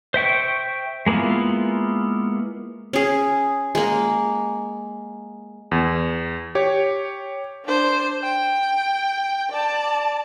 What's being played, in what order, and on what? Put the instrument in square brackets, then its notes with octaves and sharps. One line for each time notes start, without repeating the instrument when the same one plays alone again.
[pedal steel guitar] C5 E5 G5 C#6
G#3 A#3 B3 E4 F4
[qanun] C#4 G#4
G#3 A#3
[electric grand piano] E2
G4 C#5
[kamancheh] D4 C5
G5
D5 A5